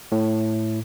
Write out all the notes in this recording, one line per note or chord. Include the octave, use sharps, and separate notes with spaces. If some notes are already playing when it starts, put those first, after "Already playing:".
A2